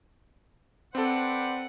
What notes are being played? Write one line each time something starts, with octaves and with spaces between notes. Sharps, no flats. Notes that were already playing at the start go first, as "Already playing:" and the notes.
C4 A4 B4 C5 D5 F#5